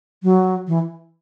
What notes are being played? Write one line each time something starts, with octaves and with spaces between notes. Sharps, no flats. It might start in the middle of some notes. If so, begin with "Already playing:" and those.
F#3
E3